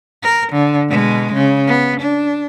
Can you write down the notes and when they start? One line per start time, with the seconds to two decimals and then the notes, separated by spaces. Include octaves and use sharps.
0.23 A#4
0.52 D3
0.89 B2 G#3
1.34 C#3
1.67 B3
2.01 D4